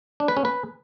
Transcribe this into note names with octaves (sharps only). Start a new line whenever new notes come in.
D4
B4
C#4
B4